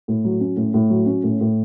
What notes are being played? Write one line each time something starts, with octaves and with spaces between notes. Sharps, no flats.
A2
F#3
C#4
A2
A2
F#3
C#4
A2
A2